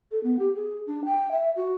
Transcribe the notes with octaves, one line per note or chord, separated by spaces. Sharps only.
A4
B3
G4
G#4
D4
G5
E5
F#4